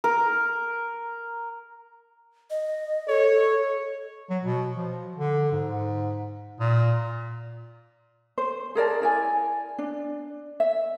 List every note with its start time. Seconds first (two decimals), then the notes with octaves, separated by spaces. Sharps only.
0.04 A#4
2.50 D#5
3.08 A4 C#5
4.30 F#3
4.44 B2
4.75 F3
5.16 D3
5.52 G#2
6.60 A#2
8.38 C5
8.75 G#4 A#4 D5 A5
9.01 E4 D5 G#5
9.78 D4
10.60 E5